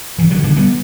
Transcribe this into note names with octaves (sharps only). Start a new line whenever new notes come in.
G2 E3
D3 F#3
D3 E3 G3
G3 B3